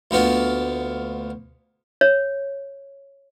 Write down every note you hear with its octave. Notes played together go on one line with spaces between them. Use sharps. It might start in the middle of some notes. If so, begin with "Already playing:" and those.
D2 A#3 B3 F4
C#5